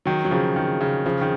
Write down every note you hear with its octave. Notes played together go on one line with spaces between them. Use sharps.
D#3 F#3
F#3
C#3 F3
D#3
C#3
C#3 F3
D#3